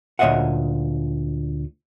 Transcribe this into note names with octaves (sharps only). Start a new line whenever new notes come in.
D2 A#2 C#5 D#5 E5 F#5